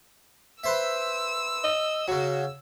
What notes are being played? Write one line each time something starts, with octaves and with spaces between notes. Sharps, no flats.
B4 C5 E5 E6
D#5
C#3 F#3 F#4